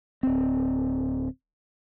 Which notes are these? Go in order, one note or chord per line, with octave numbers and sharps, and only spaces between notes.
D1 C4